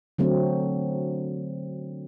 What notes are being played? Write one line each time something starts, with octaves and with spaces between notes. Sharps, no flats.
D3 F#3 A3 C4